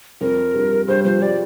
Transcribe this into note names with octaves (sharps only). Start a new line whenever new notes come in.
F2 A#4
G2
G2 C5
F3 C5
G3 D5